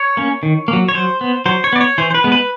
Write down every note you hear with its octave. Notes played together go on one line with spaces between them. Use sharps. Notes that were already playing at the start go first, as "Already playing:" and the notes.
Already playing: C#5
A#3 C#4
D#3
A#3
F#3
C#5
F#3 C5
B3
F#3 C5
C#5
B3 D5
C#5
E3 C5
C5
B4
G#3 B3
B4